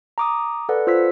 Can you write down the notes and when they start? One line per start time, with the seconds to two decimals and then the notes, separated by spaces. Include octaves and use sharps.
0.18 A#5 D6 D#6
0.69 A4 B4 D5 F#5
0.87 F4 C5 E6 G#6 B6